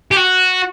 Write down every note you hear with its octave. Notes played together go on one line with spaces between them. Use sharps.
G4
F#4